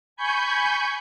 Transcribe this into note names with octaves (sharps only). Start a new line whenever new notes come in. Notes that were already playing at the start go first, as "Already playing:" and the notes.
G#5 B5 C#6 G6